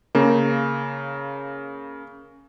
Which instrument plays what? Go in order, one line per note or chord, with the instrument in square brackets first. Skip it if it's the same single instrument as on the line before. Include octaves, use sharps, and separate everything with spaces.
[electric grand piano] C#3 A#3